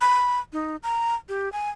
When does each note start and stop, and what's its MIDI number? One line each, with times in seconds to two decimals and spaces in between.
0.01 0.40 83
0.53 0.76 63
0.83 1.15 82
1.29 1.51 67
1.52 1.70 80